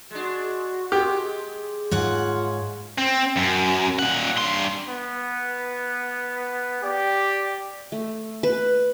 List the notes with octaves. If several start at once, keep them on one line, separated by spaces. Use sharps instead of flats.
G#3 D4 F#4
G#3 G4
G#2 F4 C#5 F#5
C4
F#2
A#2 F#5
G2 C6
B3
G4 D5
A3
B4